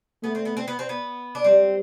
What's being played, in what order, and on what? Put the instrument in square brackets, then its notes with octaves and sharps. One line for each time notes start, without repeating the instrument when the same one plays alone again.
[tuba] A3 [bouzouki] B3
[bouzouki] C4
B3
C4
B3
C4
B3
D4
[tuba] G3 [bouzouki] C4